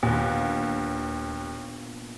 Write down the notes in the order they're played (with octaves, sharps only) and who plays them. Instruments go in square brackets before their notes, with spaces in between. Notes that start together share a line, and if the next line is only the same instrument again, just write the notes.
[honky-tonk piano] D#2 [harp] A#2 B3 D4